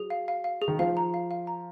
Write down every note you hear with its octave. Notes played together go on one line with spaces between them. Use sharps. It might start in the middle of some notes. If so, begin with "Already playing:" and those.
Already playing: F#3 G#4
F5
F5
F5
G#4
D#3
F3 F5
A#5
F5
F5
A#5